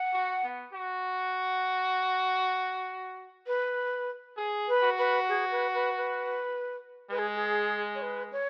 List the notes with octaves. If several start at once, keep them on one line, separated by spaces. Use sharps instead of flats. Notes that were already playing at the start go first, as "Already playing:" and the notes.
Already playing: F#5
F#4
B3
F#4
B4
G#4
B4
F#4
B4
G#4
B4
B4
B4
G#3 B4
G#4
G#4
C#5
B4
C#5